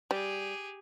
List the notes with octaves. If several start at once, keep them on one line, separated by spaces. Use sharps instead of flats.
G3 G4 G#4